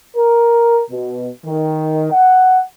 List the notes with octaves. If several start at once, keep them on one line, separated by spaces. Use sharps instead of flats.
A#4
B2
D#3
F#5